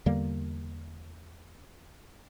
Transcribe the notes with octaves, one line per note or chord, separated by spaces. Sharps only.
E2 D3 G3 A#3